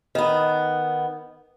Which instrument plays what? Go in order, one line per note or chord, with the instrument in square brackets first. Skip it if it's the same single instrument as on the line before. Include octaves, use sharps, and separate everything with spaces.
[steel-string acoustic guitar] D#3 B3